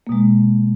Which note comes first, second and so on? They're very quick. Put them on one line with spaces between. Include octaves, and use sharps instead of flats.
A#3 B2 G#3